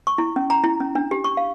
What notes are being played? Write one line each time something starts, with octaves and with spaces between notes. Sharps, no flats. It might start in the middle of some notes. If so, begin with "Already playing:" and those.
C#6
E4
C#4
A#5
E4
C#4
D4
G4
C#6
F5